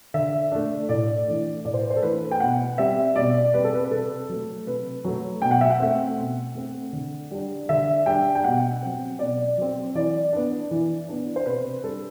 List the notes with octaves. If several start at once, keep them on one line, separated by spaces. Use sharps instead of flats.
D3 E5
A3 D4
A2 D5
E3 A3 D4
A2 D5
C5
B4
C5
A4
E3 A3 D4 B4
G5
B2 F#5
G3 C4 E5
B2 D5
G3 C4 B4
A4
B4
B4
C3 A4
F#3 A3
C3 B4
F#3 A3
B2 G5
F#5
E5
F#5
A3 C4
B2
A3 C4
D3
G3 D4
D3 E5
G3 D4 G5
G5
B2 F#5
F#3 C4
B2 D5
F#3 C4
E3 D5
B3 D4
E3
B3 D4
C5
C3 B4
G3 D4 A4